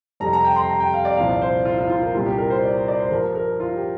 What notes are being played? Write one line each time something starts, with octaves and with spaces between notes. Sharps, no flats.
F2 C3 G3 A#5
A#5
G5
C6
A#5
G5
F5
D5
C2 A#2 F3 F5
D5
C5
F4
F4
F4
A#4
C2 A#2 G3 F4
G4
A#4
C5
D5
D5
C5
G2 F3 A#4
A#4
F4
G4